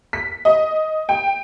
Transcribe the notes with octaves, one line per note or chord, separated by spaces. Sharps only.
B6
D#5
G5